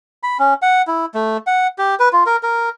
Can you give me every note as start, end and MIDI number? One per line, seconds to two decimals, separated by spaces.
0.23 0.37 83
0.39 0.54 61
0.62 0.82 78
0.87 1.06 64
1.14 1.37 57
1.47 1.67 78
1.78 1.95 67
2.00 2.09 71
2.13 2.24 65
2.26 2.36 70
2.43 2.69 70